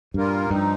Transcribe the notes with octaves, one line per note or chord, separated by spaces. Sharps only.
G2 A#2 G3 A#3 F4 A#4
G2 F3 C4 D#4